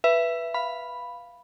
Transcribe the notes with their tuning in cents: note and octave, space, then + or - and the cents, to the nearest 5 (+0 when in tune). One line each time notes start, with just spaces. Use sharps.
B4 -5 E5 +20
F5 +0 B5 +0